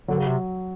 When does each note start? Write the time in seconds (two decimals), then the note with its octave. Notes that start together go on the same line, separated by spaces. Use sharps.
0.08 D3 F#3
0.18 C#3
0.27 C3